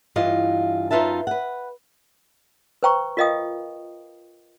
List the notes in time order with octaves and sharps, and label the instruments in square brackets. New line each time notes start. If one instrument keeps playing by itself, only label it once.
[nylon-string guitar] G2 E3 F4 D#5 F5
F#2 D#4 F4 B4 E5 A5
B4 F#5
[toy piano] B4 C5 G5 A#5 C#6
F4 A#4 D#5 F5 G5 D#6